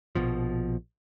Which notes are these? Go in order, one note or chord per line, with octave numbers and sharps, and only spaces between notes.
A#1 B2 F3